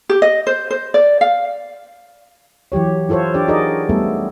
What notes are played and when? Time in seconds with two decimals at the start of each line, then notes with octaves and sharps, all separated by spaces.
0.09 G4
0.22 D#5
0.47 C5
0.70 C5
0.94 D5
1.21 F5
2.72 E3 F#3 G4 C#5
3.09 E4 F4 A4 C5 C#5
3.34 D4 G4 D5
3.48 D#4 F#4 G#4 A#4 D5 D#5
3.89 G3 A3 B3 A4